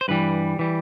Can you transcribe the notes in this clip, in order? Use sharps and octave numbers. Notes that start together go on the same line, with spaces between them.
C5
G2 E3 G3 B4
E3 G3